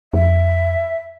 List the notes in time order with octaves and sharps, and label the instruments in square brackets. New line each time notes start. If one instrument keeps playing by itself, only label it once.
[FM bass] F2 [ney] E5